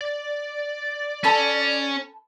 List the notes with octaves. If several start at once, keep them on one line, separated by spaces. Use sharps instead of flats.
D5
C#4 A4 B5